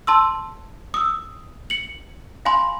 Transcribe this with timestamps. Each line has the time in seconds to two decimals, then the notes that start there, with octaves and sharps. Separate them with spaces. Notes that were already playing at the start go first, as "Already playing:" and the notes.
0.07 A5 C6 E6
0.94 D#6 E6
1.70 C#7 F#7
2.45 F5 G#5 B5 C6